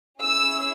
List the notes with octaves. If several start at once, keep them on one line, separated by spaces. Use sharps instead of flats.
C#4 E4 G#4 E6